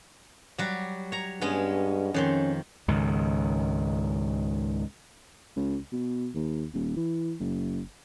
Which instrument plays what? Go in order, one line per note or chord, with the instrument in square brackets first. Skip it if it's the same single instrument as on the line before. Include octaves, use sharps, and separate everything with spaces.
[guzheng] F#3 G3 F#4
C#5 A#5
[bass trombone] G2 [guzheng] G#3 B3 C#4
[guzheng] F2 D#3 C6 [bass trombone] C#4
[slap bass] C#2 G#2 D#3
[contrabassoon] C#2
B2
D#2
D#1
E3
F#1